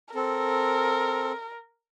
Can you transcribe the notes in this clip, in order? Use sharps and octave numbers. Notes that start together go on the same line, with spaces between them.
C4 A4 A#4